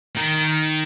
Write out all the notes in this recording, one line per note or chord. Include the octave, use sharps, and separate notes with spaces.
D#3